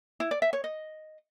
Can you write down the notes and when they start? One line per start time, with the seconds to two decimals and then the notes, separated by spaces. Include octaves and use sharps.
0.20 E4
0.31 D5
0.42 E5
0.53 C#5
0.64 D#5